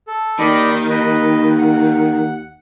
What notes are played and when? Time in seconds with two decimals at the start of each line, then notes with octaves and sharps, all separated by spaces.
0.07 A4
0.39 D#2 D#3 D5 D#5 B5
0.89 B4 D#5
1.58 F#5